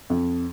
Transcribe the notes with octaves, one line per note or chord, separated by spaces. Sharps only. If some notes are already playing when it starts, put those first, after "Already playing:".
F2